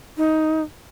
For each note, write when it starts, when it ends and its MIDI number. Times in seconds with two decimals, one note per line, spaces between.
0.18 0.61 63